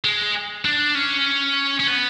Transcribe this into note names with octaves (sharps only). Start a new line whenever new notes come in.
G#3
D4
C#4
C#4
B3